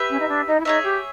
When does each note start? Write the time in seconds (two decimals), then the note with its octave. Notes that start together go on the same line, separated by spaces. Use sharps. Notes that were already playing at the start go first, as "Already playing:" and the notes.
Already playing: G4 B4 E5
0.10 C#4
0.19 D#4
0.28 D4
0.47 D#4
0.60 E4
0.65 D#4 G#4 C#5 E5
0.84 G4